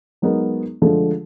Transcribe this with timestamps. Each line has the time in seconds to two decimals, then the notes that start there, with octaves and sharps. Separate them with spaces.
0.22 F#3 G#3 B3 D#4 A#4
0.82 D3 F3 G#3 A3